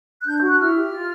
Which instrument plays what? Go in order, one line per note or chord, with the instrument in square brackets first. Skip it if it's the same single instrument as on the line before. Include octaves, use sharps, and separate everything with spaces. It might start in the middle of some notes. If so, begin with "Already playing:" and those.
[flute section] F#6
D4 G6
G6
F#4
F#6
E4 F6
G4
F4